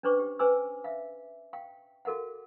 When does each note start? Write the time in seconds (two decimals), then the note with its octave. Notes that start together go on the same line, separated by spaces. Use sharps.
0.03 C#4 D4 B4 C5 C#6 D6
0.19 G4
0.39 C#4 B4 C5 G#5 D6 E6
0.84 E5 F5
1.53 F5 G5
2.05 F#4 A4 A#4 F5 F#5